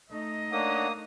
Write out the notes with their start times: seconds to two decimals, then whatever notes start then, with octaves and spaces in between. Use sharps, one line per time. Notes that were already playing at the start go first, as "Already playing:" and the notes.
0.10 A3 D#4 D#5
0.52 A#3 D4 C#5 F#5 D#6